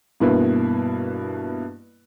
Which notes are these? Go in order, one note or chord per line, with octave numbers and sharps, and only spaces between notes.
G2 B2 A#3 E4 B4